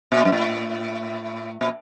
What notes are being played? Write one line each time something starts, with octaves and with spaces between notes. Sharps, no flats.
A#2
F#2
A2
A#2